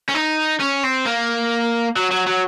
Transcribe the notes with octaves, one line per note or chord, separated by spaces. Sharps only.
C#4
D#4
C#4
C4
A#3
F#3
F#3
F#3